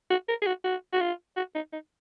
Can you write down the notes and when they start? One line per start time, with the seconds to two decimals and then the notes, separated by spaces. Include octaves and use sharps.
0.10 F#4
0.29 A#4
0.42 G#4
0.46 F#4
0.64 F#4
0.92 F#4
1.01 F4
1.37 F#4
1.55 D#4
1.73 D#4